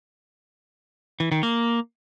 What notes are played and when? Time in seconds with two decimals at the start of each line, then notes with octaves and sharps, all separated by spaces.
1.20 E3
1.32 D#3
1.43 A#3